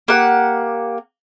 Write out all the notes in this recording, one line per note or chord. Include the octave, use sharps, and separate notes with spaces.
A#3 G4 F#5